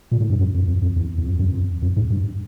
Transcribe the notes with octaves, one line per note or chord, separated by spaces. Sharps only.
A#2
A2
G2
F#2
F2
F2
F2
E2
E2
F2
F#2
F2
F2
G#2
G2